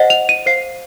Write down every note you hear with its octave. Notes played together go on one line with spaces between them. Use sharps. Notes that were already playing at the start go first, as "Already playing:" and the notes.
Already playing: C5 D#5 F#5
F7
D#7
C5 F5 C7